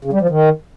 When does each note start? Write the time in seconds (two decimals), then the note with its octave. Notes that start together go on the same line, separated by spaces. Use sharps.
0.05 C#3
0.13 G3
0.21 F3
0.29 D#3